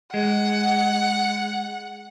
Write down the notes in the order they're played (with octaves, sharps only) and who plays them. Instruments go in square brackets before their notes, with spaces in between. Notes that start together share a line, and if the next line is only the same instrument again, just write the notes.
[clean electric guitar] G#3 [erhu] F#5